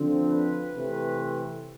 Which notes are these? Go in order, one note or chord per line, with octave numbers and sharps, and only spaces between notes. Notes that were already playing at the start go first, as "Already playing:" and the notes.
Already playing: D3 F3 C4
B4
C3 E3 A3 C4